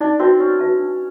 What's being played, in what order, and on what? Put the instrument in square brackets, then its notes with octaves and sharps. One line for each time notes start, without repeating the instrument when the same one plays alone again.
[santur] D4 [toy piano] D#4
[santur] C4 [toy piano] F#4 B4 E5 A5
[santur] C#4 [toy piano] D#4
[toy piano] F#4 B4 E5 A5
D4